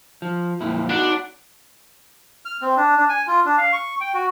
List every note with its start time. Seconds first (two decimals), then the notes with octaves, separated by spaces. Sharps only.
0.22 F3
0.60 F2 A#2 E4
0.90 D4 D#4 F#4 F#5
2.45 F6
2.62 C4
2.77 D4
2.97 D4
3.09 G#5
3.27 F4
3.45 D4
3.58 F5
3.73 C#6
4.01 G5
4.14 F#4